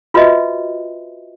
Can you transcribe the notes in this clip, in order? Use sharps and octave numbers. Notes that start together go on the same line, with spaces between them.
F4 F#4 B4 C5 D#5 E5